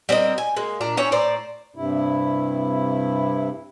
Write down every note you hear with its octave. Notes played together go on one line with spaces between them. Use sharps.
G3 C4 A#4 D#5
G#5
G#3 A#3
A#2 D4 A#5
C#4 E4 C#5 G5
A2 C5 D5 A#5
G2 C3 E4